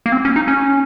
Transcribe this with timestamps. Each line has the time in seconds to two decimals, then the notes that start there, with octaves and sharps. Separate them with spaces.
0.06 A#3
0.12 C4
0.25 C#4
0.36 D#4
0.48 C#4